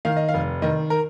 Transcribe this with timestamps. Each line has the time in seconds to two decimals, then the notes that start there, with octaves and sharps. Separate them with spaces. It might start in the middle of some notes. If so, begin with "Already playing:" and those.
0.05 D#3 F5
0.16 D#5
0.29 F5
0.34 F1
0.62 D#3 D#5
0.90 A#4